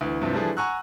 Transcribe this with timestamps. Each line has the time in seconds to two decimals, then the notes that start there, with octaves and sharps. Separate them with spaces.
0.01 D2 E3
0.22 G2 C3 E3 F3
0.34 E3 F3 G3 A3 D4 G#4
0.57 F#5 G#5 A#5 C#6 E6 F#6